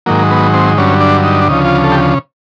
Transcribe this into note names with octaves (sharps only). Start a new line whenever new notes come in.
G#2 D#3 F#3 A#3
B3
C4
G2 D3 F#3 C#4
D4
D#4
D4
D2 C#3 F3 D#4
F4
A4
G4